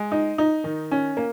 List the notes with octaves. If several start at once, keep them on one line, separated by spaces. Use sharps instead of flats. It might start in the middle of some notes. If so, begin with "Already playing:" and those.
Already playing: G#3
D#4
D#4
D#3
C#4
A#3